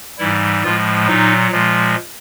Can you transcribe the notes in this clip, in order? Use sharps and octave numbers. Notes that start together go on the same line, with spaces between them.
G#2 E3 G3 E4
A2 F3 G#3 F4
A#2 F#3 D#4
A#2 F3 G#3